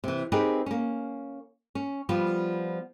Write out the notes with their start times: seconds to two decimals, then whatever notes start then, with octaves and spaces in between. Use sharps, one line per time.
0.04 C3 E3
0.32 C4 D#4 G4 G#4 A#4 B4
0.66 A#3 C#4
1.75 C#4
2.09 F3 G3 B3 F4